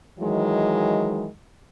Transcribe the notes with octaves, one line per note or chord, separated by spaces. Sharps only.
D#3 E3 F#3 G#3